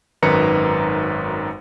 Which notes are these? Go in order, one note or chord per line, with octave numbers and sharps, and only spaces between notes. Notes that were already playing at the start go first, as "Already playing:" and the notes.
G#1 F#2 D#3 B4 A#5 C#7